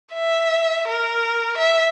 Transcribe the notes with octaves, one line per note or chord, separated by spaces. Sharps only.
E5
A#4
E5